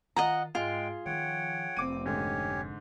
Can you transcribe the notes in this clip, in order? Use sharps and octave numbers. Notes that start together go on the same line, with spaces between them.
D#3 F4 D#5 F#5 A#5
G#2 G#3 F4 G#4 G5
D#3 F3 C#5 F#5 G5
F1 C4 D6 D#7
G#2 D3 C#4 G4 C#5